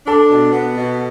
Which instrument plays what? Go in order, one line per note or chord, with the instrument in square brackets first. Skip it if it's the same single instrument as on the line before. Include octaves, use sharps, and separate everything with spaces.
[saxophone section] D4 [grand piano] A4
[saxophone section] B2
B3
B2